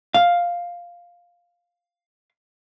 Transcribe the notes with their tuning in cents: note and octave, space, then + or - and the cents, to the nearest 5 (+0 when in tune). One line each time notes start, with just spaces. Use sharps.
F5 +5